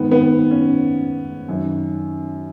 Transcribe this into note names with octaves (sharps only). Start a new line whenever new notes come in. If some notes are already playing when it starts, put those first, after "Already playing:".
Already playing: G#2 D#3 B3
B3
C#4
F#2 D#3